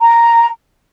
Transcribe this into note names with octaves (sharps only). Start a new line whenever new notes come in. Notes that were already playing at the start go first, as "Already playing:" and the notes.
A#5